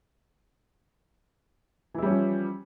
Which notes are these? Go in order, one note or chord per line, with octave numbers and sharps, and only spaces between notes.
E3 F3 G3 C#4 E4